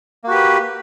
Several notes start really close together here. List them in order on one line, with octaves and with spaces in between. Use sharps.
A#3 F#4 G4 B4